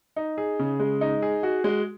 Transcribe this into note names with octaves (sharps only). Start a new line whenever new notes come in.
D#4
G#4
C#3
G#3
D#4
G#4
F#4
G#3